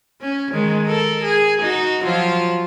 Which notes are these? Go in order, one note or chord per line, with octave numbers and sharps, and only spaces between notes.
C#4
D#3 G#3
A4 A#4
G#4
D#4 F#4
F3 F#3 F4